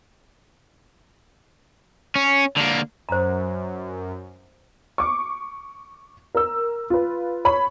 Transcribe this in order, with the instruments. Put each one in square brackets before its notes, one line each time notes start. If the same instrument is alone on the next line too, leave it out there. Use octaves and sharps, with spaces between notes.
[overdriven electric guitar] C#4
D3 A#3
[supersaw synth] F#2 [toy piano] C5 A#5
[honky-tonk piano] C#6 D6
A#4 E6
F4 B4
C#5 B5